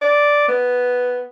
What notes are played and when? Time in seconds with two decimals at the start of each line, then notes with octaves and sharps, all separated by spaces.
0.02 D5
0.48 B3